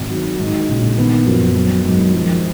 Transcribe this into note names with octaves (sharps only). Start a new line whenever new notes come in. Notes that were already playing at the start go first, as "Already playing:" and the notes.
Already playing: G#1
D#3 F#3
G#2 D#3
A#1 C#3
D#3 B3
F#2 F3
D#3 F#3
G#2 F#3
D#3 F3